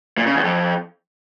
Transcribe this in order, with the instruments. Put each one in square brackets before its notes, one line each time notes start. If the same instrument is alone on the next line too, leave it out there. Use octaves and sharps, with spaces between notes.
[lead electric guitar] A#2
C#3
E2
F2